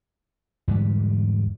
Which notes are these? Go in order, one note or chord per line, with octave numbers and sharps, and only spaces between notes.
E2 G#2 D3 G3